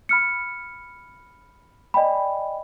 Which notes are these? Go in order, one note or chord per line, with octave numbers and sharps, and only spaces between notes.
B5 F6 C#7
D5 D#5 G5 G#5 B5